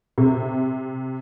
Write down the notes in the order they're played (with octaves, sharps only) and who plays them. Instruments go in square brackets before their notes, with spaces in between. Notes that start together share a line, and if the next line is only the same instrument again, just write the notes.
[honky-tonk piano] C3